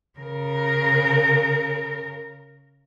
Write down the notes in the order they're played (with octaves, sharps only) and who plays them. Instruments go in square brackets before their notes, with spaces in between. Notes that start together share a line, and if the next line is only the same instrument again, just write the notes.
[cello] C#3 A#4